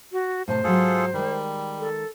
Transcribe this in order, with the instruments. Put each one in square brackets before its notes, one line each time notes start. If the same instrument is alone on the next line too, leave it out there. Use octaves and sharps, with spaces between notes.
[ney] F#4
[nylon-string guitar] A2 C3 A5 [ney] C5
[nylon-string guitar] G#2 F#3 [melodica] F4 G#4 A4
[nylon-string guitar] D#3 G#3 [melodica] G3
[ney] A4